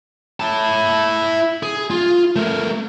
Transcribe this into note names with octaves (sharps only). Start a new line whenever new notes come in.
E4 A5
G#4
F4
A3 A#4